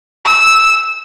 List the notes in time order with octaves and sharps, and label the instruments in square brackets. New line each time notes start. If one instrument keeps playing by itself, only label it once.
[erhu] E6